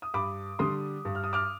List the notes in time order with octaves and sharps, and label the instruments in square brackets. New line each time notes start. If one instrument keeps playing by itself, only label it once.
[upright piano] D#6
[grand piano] G2 [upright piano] B5 D6
[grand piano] D3 G3 [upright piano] C6 D#6
[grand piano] G2
[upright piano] F6
D#6
D6 F6